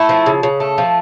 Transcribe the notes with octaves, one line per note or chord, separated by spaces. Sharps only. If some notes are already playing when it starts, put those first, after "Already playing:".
Already playing: A3 E4
F3
C#3
C#3
A3
F3